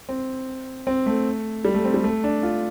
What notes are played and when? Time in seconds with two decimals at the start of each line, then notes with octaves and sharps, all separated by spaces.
0.09 C4
0.87 C4
1.06 A3
1.65 G3
1.74 A3
1.85 C4
1.94 G3
2.04 A3
2.24 D4
2.43 F4